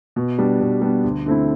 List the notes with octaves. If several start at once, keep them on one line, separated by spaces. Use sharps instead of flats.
B2
G3 B3 D4
B2
G3 B3 D4
D2
D3 A3 C4 E4